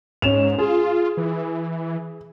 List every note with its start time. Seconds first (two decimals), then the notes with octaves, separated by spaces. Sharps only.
0.22 G#2 C#4 E7 F7
0.58 F4 G#4
1.17 E3